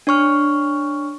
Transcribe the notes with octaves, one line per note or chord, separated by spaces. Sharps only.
D4 C#5 C#6 F6